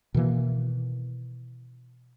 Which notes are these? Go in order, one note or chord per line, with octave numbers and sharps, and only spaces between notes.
B2 D#3 E3 A#3